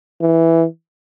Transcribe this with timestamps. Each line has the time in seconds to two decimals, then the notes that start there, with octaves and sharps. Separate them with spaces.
0.21 E3